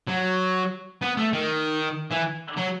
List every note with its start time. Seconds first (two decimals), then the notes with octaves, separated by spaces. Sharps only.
0.08 F#3
1.02 B3
1.17 A3
1.33 D#3
2.11 E3
2.57 F#3